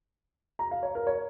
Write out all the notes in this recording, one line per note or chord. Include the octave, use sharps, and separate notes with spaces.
A#5
F5
C#5
A#4
C#5